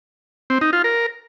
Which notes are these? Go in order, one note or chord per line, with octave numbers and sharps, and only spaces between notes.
C4
D#4
F4
A#4